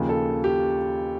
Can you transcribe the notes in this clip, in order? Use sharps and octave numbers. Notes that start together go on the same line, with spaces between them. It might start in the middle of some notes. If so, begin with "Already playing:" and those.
Already playing: D#2 C#3 F3
A4
G4